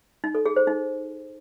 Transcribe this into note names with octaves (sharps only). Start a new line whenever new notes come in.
D#4
A4
G#4
C5
D#4